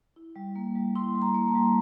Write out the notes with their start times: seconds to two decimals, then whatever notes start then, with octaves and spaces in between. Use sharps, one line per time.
0.16 E4
0.36 G3
0.56 A#3
0.76 G3
0.95 E4 C6
1.15 G3
1.22 A#5
1.35 A#3
1.48 A5
1.55 G3